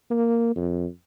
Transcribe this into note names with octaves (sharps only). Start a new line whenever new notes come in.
A#3
F2